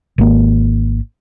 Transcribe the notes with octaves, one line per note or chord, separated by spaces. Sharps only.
G#1 A#3